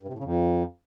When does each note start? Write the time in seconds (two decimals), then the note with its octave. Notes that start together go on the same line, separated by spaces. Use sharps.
0.03 G2
0.08 C3
0.13 A2
0.19 C#3
0.24 F2